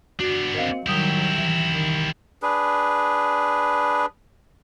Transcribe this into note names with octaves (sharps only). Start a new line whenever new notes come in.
B3 D4 F#4
C4 A#4 D#5 F5
D#3 F#3 G3 E4 G4 D#6
E3
D#3
D4 G#4 B4